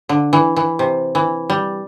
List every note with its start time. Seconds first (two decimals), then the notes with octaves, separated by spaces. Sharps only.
0.09 D3
0.33 E3
0.56 E3
0.79 C3
1.15 E3
1.50 G3